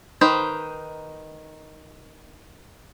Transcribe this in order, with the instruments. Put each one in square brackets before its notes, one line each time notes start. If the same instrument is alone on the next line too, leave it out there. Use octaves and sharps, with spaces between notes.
[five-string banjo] D#3 D#4 B4 C5